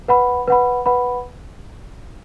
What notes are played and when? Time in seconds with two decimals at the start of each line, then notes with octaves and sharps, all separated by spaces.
0.08 B4 F#5 B5
0.47 B4 F#5 B5
0.86 B4 F#5 B5